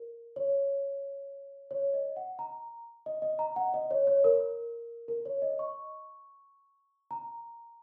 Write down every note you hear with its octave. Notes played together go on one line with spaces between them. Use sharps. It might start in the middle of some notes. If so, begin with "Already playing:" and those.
Already playing: A#4
C#5
C#5
D#5
F#5
A#5
D#5
D#5
A#5
F#5
D#5
C#5
C#5
A#4
A#4
C#5
D#5
C#6
A#5